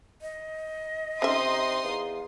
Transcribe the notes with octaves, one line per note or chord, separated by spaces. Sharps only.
D#5
C3 C#4 D#4 E5 C6 D#6
E2 F5